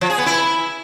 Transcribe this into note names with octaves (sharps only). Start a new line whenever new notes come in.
F3
G#4
B3
E4